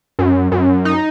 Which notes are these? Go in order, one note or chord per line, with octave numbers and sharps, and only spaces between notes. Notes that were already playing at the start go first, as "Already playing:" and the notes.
F#2
F#2
D#4